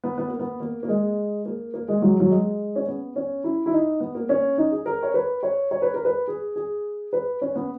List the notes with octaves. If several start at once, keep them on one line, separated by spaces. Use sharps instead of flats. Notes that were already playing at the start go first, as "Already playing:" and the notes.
B3
B3
A#3
B3
A#3
A#3
G#3
A#3
A#3
G#3
F#3
F#3
G#3
C#4
B3
C#4
E4
E4
D#4
B3
A#3
C#4
D#4
G#4
A#4
C#5
B4
C#5
C#5
B4
A#4
B4
G#4
G#4
B4
C#4
B3